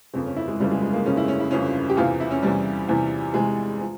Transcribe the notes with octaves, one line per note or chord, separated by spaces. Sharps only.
G1 F2 C#3 C4
C#4
E4
G#3
G1 F2 C#3 G3
G#3
G#3
A#3
G1 F2 C#3 C#4
E4
C#4
E4
G1 F2 C#3 C#4
G4
E2 C3 E3 F4
E4
C#4
E2 C3 E3 G3
E2 C3 E3
E2 C3 E3 G#3
F3